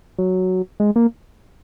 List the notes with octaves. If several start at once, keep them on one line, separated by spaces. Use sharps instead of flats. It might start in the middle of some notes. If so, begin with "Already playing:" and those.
F#3
G#3
A#3